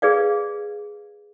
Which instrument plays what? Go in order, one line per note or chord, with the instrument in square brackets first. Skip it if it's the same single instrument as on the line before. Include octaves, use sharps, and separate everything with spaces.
[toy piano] G#4 B4 D5 F5